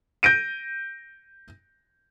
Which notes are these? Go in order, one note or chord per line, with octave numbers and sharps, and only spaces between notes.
G6 A#6 D7 D#7